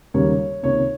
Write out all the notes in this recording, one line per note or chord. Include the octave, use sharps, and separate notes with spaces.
D#2 C#3 G3 A#3 C#5
C#2 C3 D#3 A#3 C#5